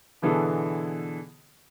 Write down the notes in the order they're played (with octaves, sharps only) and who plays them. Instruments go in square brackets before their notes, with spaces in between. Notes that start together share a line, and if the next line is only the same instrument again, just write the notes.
[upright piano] B2 D3 E3 B3 G#4 A4